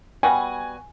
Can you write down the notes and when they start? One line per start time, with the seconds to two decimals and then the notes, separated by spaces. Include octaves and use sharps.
0.23 G3 B3 F#4 G#5